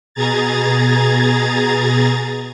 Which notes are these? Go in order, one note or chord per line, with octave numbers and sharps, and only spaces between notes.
B2 G#4 A#5 G#6 A6